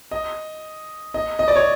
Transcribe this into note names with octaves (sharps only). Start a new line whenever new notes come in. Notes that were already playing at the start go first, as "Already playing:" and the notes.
D#5
D#5
D#5
D5
C#5